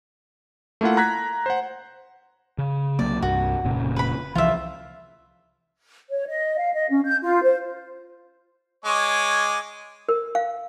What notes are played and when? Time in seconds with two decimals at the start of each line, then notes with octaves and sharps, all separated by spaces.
0.81 A3 A#3 E4 F4 F#5
0.97 A#5 F#6 G#6 B6
1.46 C5 F#5
2.58 C#3
2.99 C2 F#3 A#3 D5
3.22 C2 G2 F#4
3.64 F1 A#2 C#3
3.96 B4 B5
4.35 C2 E3 F3 F4 E5
6.10 C#5
6.26 D#5
6.58 F5
6.73 D#5
6.90 C#4
7.05 G6
7.22 F4
7.43 C5
8.85 G#3 C#5 D6
10.09 A#4
10.35 F5